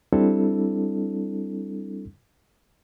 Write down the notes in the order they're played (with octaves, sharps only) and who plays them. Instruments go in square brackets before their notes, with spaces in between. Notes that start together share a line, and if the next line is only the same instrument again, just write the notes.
[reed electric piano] G3 C4 D4 E4 A4